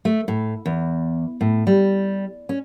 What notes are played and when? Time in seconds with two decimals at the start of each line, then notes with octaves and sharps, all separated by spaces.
0.05 A3
0.28 A2
0.66 E2
1.41 A2
1.67 G3
2.49 C#4